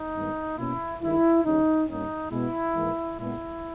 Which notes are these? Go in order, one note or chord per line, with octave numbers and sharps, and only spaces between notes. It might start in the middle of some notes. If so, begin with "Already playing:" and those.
Already playing: D#4
G2 D#3 G#3 B3
B2 A#3 C#4 E4
G2 D#3 G#3 E4
D#2 C#3 G3 C#4 D#4
G2 G3 A#3 C#4 D#4
B2 G#3 B3 E4
G#2 E3 A#3
A#2 G#3 B3 E4